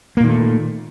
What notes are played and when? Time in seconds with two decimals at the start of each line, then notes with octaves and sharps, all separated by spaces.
0.17 A#3
0.20 A#2
0.24 D#3
0.27 A3